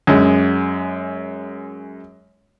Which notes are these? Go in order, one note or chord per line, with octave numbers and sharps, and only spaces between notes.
F#2 G#3